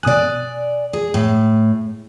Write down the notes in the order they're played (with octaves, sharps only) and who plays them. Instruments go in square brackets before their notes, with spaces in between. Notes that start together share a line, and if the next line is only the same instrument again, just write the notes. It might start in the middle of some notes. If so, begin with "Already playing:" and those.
[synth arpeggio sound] B2 D#6 F#6 [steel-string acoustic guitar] D5 G#5
[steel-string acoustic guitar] G#4
A2